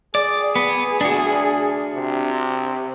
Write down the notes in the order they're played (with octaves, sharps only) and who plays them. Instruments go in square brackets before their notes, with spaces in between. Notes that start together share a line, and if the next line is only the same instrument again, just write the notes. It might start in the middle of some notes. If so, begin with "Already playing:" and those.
[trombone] G#4 [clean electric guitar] D5
[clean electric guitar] B3
D4 F#4
[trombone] C3